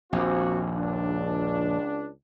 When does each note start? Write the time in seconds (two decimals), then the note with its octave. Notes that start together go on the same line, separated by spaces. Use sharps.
0.13 A#1 D#2 C4 F#4
0.76 C#2 D4